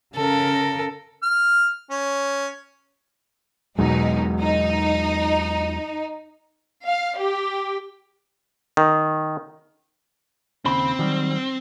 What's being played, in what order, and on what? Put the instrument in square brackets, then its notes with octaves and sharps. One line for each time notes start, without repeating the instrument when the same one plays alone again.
[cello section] C#3 A#4 [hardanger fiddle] A4
[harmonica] F6
C#4
[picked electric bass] E2 F#3 G#3 [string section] B2 D#4
[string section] D#4
F5
G4
[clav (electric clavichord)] D#3
[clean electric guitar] D#2 C#3 B5 [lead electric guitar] C4
[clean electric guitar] D#3 F#3 G3